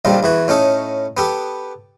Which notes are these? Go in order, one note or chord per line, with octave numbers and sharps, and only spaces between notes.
A#1 F2 D#3 F3 G3
E2 E3 F#4
A2 C#4 D#4 A4
B3 G4 A4